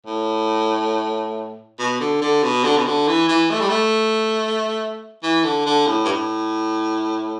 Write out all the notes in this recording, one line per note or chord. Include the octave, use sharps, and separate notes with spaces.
A2
B2
D3
D3
B2
D3
B2
D3
E3
E3
A3
G3
A3
E3
D3
D3
A2
G2
A2